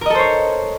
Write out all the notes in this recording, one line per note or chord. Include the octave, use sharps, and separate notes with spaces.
A4 A#4 C5 C#5 D#5